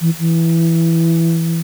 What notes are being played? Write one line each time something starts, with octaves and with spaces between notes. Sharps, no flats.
E3
E3